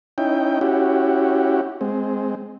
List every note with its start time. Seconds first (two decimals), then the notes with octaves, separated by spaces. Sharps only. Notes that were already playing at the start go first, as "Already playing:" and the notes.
0.18 C#4 D#4 E4 G5
0.61 C#4 E4 F#4 G4
1.81 G#3 C4